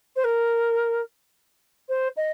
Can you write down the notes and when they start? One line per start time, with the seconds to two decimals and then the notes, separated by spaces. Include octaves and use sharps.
0.16 C5
0.24 A#4
1.89 C5
2.17 D#5